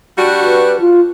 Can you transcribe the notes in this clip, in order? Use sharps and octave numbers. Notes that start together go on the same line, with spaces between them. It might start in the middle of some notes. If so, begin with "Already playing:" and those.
G3 D4 F#4
B4
F4